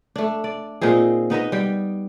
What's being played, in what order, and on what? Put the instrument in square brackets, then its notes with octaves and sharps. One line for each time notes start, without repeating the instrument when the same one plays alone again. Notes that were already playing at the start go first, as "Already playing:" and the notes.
[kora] A3 D4
D5
A#2 C4 D#4 G#4
B3 D#4 B4 D#5
G3 G5